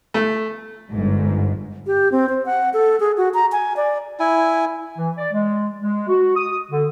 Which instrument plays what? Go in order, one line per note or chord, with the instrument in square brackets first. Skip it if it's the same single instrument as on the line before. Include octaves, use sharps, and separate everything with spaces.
[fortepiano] A3
[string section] G1 G#2
[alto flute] G4
C4
C5
F#5
A4
G#4
F#4
A#5
G#5
D5
[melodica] E4 G#5
[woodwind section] E3
D5
G#3
G#3
F#4
D#6
D3